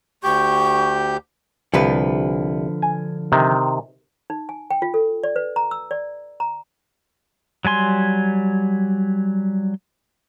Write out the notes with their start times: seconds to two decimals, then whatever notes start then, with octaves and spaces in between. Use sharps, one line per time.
0.24 D2 G4 C#6 G6
1.74 C2 D3 F3 B4
2.82 G#5
3.32 C3 D#3
4.30 D#4
4.49 G#5
4.71 G5
4.82 F4
4.94 A4
5.24 D5
5.36 B4
5.56 A#5
5.71 E6
5.91 D5
6.40 A#5
7.65 F#3 G3 G#5 C6